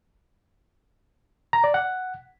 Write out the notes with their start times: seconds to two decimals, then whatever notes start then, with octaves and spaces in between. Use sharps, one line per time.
1.53 A#5
1.64 D5
1.74 F#5